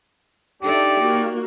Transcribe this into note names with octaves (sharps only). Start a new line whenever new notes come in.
D4 D#4 G4 A4 D5 E5
A#3 F#4